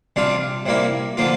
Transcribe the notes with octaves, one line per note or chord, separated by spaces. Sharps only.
C3 G3 D4 F4
C3 G3 A#3 E4
D3 F3 A#3 F4